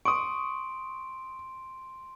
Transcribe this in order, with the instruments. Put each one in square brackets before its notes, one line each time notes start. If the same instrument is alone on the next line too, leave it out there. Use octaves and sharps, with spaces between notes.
[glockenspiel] C6 D7 [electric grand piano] C#6 D#6